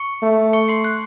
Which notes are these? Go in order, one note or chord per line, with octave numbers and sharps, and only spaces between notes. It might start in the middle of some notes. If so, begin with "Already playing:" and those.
Already playing: C#6 C#7
A3
C#6 C#7
C6 C7
F#6